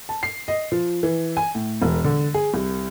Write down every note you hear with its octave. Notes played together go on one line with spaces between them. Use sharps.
A5
C7
D#5
F3
E3
G#5
A2
E1
D3
G#4
C2